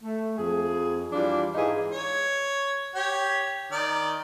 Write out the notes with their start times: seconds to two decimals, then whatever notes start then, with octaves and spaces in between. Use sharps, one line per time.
0.03 A3
0.37 F2 G#4
1.12 E3 G3 D4 F4
1.55 G#2 E3 D#4 F4 G#4
1.91 C#5
2.95 G4 C#5
3.72 D#3 D5